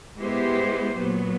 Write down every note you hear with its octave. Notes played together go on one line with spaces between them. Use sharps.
G#3 B3 E4 G4 C5
A#2 F#3 B3